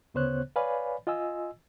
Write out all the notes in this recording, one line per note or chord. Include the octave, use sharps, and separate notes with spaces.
D2 C#3 B3 C5 C#5 F#6
B4 C#5 D5 F5 G#5 B5
F4 D#5 G#5 E6